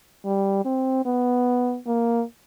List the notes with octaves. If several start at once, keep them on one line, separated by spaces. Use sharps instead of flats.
G3
C4
B3
A#3